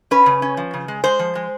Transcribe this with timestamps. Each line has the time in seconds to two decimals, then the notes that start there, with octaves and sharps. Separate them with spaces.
0.11 C#4 B4
0.26 C#3
0.42 C#4
0.57 F3
0.74 C#3
0.88 G#3
1.04 G#3 C5
1.19 F3
1.35 G#3